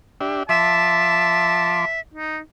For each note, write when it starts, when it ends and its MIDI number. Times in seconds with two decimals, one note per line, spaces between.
0.21 0.43 62
0.21 0.43 67
0.21 0.43 76
0.49 1.85 53
0.49 2.00 76
0.49 1.86 81
0.49 1.85 84
0.49 1.85 86
2.14 2.39 63